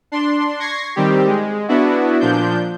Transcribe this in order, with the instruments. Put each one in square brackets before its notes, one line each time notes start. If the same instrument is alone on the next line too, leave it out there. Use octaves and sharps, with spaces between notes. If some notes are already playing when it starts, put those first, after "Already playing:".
[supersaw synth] D4 C6
C#6 G#6 A#6 C7
D#3 G3 C4 G4
G#3
B3 D4 E4 F#4
A#2 F3 D4 G6